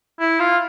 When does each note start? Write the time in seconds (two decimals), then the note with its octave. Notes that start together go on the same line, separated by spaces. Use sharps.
0.20 E4
0.40 F4